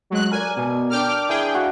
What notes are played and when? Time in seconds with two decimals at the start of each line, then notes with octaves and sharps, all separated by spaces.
0.10 F#3 G#3 F#6
0.32 A#4 D5 G#5
0.56 B2
0.90 D4 A#4 G5 D6 F6
1.29 E3 G#4 G5
1.54 F#4 F5